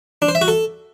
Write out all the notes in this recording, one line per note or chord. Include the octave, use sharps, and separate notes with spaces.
D4
C5
E5
F#4
A4